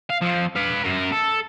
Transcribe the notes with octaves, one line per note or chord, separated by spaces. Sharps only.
F5
F2 F3
B4 F5
F#2 A#4
A4